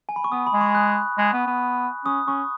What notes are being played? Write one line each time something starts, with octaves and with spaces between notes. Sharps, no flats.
G#5
B5
C#6
B3 D#6
B5
G#3
C#6
F#6
G#3
B3
B3
C#4 D#6
C#4 C#6